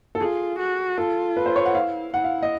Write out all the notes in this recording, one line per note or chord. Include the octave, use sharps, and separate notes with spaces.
A4
F4 G#4
F#4
F4 A4
B4
C5
C#5
F#5
E4 F5
E4 F#5
F5
D#5